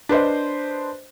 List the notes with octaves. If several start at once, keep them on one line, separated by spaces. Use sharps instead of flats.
D4 B4 C5 D#5